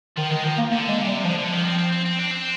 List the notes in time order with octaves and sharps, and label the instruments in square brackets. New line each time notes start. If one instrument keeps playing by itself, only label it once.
[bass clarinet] D#3 [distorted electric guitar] F3
[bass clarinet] D#3 [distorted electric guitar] G#3
[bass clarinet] D#3 [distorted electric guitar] F3
[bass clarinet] A#3
[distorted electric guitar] D3 [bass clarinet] A#3
[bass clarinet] G#3
[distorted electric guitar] C3
[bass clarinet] G3
[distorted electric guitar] D3 [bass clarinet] F3
[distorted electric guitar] D3
[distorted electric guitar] D#3 [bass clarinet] F3
[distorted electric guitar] C4
C4
C4
C4
D4
C4